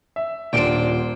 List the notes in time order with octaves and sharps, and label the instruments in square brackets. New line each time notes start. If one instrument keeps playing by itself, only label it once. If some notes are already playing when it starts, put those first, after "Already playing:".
[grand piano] E5
[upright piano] D#1 D7 [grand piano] A#2 [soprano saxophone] D4 [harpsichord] C5 G5